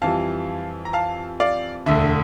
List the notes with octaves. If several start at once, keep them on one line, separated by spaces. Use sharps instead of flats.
F2 E3 G3 F5 A5
A#5
F5 A5
D5 F5
E1 D2 D3 E5